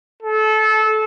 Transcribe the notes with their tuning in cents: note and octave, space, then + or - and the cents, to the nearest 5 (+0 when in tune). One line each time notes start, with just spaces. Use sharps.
A4 -25